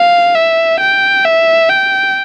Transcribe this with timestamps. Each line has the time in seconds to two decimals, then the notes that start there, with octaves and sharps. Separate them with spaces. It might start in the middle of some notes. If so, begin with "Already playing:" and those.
Already playing: F5
0.35 E5
0.80 G5
1.25 E5
1.70 G5